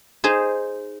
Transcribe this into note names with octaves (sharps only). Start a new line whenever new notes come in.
D#4 G#4 C5